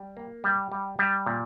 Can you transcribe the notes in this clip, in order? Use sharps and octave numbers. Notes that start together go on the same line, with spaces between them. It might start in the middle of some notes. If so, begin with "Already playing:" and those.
Already playing: G3
A#3
G3
G3
G3
A#2